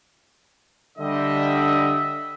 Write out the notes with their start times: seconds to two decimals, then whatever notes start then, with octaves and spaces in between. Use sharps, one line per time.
0.98 D3 G3 D#5 E5